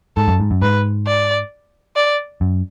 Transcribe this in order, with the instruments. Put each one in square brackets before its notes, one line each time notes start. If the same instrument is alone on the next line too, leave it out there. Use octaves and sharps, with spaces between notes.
[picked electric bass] G#2 [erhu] A4
[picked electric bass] F#2
G#2
F#2
[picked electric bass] G#2 [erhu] B4
[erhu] D5
D5
[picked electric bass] F#2